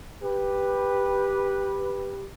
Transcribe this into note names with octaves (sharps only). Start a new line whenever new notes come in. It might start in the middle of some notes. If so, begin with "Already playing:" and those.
G4 B4